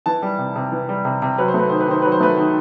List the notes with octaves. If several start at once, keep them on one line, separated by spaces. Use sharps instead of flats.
E3 A5
G3
C3
C3
E3
G3
C3
C3
F#3 B4
C5
A3
B4
D#3 C5
B4
D#3 C5
F#3 B4
C5
A3 B4
D#3